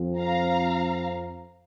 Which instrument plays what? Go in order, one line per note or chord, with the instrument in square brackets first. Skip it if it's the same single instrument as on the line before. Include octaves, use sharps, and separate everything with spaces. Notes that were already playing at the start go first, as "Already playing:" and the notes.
Already playing: [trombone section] F2 F3 C4
[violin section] F5 A#5